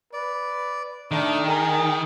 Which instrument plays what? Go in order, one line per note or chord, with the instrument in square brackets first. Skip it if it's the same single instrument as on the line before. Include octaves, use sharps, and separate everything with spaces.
[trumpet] B4 [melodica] D5
[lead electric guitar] D#3 [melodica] A3 G5 [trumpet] D4
[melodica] D#4 G#4 [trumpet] A#4